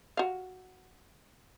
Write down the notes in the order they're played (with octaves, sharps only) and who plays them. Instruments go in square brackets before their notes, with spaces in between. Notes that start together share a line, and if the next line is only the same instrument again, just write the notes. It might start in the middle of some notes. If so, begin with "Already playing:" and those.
[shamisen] F#4 F5